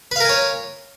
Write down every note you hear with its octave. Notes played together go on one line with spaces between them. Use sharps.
A#4 B4 C#5 F5 G#5